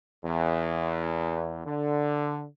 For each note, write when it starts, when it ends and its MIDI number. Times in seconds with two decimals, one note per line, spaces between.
0.25 1.61 40
1.67 2.45 50